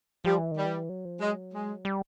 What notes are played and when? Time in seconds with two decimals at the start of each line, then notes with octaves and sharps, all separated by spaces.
0.25 F3 G3
0.38 E3
0.51 D#3
0.57 G3
0.66 E3
0.89 F#3
1.05 F3
1.21 F#3 G#3
1.53 G#3
1.85 G3